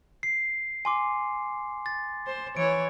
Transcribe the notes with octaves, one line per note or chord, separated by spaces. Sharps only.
C7
G#5 C6 D6
A6
C5
E3 C#5 D7